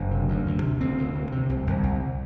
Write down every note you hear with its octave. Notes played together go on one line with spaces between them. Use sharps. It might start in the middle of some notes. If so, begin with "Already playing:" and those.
Already playing: F#1 D4
C3
D2
D2
C3
D2 C4
D2
D2
C3
C2
C2
C2